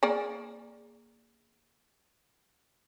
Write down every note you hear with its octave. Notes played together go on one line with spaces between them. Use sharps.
A#3 G#4 D5